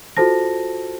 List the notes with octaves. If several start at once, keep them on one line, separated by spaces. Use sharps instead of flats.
F4 F#4 A4 C5 A5 A#6